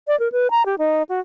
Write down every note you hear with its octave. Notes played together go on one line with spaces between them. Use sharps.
D5
A#4
B4
A#5
G4
D#4
F#4